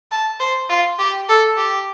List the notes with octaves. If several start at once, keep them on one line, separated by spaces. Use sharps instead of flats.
A5
C5
F4
G4
A4
G4